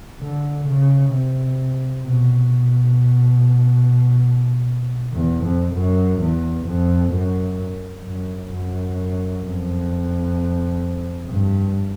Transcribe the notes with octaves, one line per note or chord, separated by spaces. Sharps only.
D3
C#3
C3
B2
E2
F2
F#2
E2
F2
F#2
F#2
F#2
F2
G2